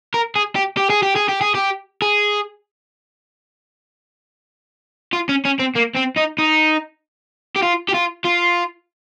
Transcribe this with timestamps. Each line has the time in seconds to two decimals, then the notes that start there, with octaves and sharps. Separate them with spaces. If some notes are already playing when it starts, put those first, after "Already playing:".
0.14 A#4
0.36 G#4
0.56 G4
0.77 G4
0.90 G#4
1.02 G4
1.16 G#4
1.29 G4
1.41 G#4
1.55 G4
2.02 G#4
5.13 F4
5.29 C#4
5.45 C#4
5.59 C4
5.76 A#3
5.96 C4
6.17 D#4
6.39 D#4
7.56 G4
7.63 F4
7.89 G4
7.94 F4
8.25 F4